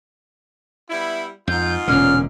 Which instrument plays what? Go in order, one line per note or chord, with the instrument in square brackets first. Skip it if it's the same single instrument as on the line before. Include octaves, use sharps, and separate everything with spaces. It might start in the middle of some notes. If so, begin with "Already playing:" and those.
[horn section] G3 B3 E4
[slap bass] F2 [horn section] G#2 F4 [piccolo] G6
[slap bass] E1 A#2 D3 [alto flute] C#4 [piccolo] F6